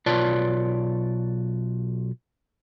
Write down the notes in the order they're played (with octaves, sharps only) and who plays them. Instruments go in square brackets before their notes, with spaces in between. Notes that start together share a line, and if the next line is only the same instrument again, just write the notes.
[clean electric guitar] B1 F4 B4 C#5 D5 A5